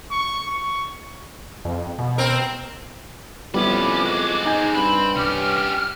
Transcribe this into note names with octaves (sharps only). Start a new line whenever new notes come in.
C#6
C#6
F2
B2
C4 A#4
F2 G3 B3 C#4 E4 B4 D6
G#3 F#4
D#4 G#5 G6
G2 C4 B5
C2 C#4 G4 D6 F6